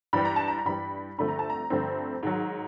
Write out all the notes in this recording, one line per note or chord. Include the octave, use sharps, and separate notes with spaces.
G2 E3 G3 B5
A#5
A5
A#5
A#5
G2 E3 G3 B5
G2 D3 F3 A3 C4 B5
A#5
A5
A#5
G2 D3 F3 A3 C4
G#2 D#3 F#3